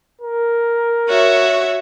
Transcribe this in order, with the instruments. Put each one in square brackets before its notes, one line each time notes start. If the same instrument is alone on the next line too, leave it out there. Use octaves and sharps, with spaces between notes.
[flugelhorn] A#4
[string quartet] F#4 C#5 E5